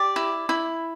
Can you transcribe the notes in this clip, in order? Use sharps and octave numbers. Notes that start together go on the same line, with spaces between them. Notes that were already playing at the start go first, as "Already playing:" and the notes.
Already playing: G4 D5
E4
E4